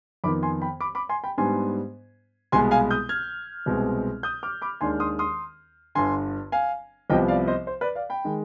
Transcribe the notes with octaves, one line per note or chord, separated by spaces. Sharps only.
F2 D#3 B3 B5 D6
G#5 C6
G5 B5
B5 D6
B5 D6
G#5 C6
G5 B5
G#2 G3 B3 D4 G#5 C6
C2 B2 G#3 B3 G#5 C6
F5 G#5
D#6 G6
F6 G#6
C2 B2 G#3 C4
D#6 G6
D6 F6
B5 D6
D#2 D#3 G#3 D4 G#5 C6
C6 D#6
C6 D#6
G1 G2 D3 G#5 C6
F5 G#5
C2 C3 F3 B3 D#5 G5
D5 F5
C5 D#5
C5
B4 D5
D5 F5
G5 B5
D#3 G#3